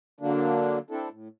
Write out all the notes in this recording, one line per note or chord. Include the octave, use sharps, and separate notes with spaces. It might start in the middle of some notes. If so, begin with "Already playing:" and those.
D3 F#3 A#3 D4
C4 D4 E4 A4
A2